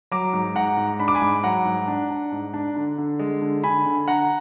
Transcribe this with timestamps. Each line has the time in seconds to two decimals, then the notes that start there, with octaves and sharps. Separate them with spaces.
0.11 F#3 A#5 D6
0.33 G#2
0.55 G#2 F#5 A#5
0.77 G#2
1.00 D4 B5
1.08 D6
1.15 G#5 B5
1.22 G#2
1.43 F#3 F#5 A#5
1.65 G#2
1.88 D4
2.10 D4
2.32 G#2
2.54 D4
2.76 D3
2.98 D3
3.19 G#3
3.42 D3
3.64 D3 G#5 B5
3.86 D3
4.08 D3 F#5 A#5